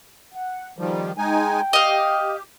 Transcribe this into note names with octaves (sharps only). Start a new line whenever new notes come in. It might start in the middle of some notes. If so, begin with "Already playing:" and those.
F#5
G2 B2 D3 D#3 F3 G3
G#3 D#4 G5 G#5
G4 D#5 F5